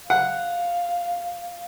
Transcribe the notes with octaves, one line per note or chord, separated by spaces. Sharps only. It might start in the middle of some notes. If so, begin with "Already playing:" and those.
F5 F#5